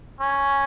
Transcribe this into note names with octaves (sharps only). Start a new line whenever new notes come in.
C#4